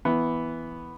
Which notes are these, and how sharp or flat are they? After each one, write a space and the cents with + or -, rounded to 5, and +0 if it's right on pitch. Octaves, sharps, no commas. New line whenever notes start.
E3 +0 B3 +0